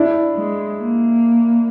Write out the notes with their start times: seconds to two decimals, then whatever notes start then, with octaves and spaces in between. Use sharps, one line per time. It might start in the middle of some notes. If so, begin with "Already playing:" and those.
Already playing: D4 E4
0.36 G#3
0.78 A#3